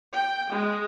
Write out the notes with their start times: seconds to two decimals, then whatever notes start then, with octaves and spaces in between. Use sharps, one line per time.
0.11 G5
0.50 G#3